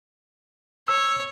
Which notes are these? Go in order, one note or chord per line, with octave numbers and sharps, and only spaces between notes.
C#5 E6